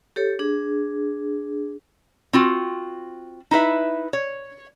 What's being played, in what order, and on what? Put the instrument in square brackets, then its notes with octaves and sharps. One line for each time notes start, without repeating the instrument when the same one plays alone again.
[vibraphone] G4 A4 C#5
D4 G#4
[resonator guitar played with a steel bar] C4 F4 F#4
D#4 E4 B4 E5
C#5